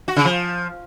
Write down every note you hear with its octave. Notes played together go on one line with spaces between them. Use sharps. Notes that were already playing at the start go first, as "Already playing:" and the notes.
F#4
C#3
F3